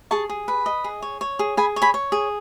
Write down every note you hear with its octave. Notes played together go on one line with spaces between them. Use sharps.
G#4 A5 C#6
G#4
B4
D#5
G#4
C#5
C#5
G#4
G#4 G#5 B5
C#5
G#5 B5
C#5
G#4